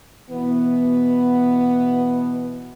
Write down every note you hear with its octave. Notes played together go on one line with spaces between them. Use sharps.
B2 E3 B3